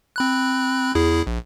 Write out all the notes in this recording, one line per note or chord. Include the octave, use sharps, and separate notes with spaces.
C4 B5 F#6
E2 E4 G#4
A#1